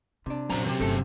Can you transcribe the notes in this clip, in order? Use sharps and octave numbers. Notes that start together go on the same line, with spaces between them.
C3 D4 F4
A#2 F#3 C4 C#4 C5 A#5
D#2 C3
G1 A3 A4